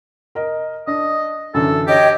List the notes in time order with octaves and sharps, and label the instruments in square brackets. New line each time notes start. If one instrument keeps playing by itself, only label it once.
[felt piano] A#4 D#5
[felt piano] D4 [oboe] D#5
[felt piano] F#2 D3 E3 [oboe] A4
[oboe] G4 [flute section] C#5 D#5 G5